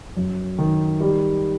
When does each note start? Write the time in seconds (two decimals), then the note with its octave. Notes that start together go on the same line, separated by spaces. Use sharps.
0.17 F#2
0.58 D#3
1.01 G3